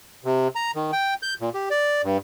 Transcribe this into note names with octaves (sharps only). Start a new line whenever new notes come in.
C3
A#5
D#3
G5
G6
A#2
G4
D5
G2